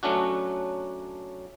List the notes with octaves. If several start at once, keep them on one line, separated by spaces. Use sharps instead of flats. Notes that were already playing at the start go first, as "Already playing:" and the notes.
F#3 A3 C#4 D4 F#4